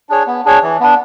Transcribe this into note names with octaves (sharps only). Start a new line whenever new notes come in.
D4 G#4 C#5
B3
D4 G#4 C#5
E3
B3 D4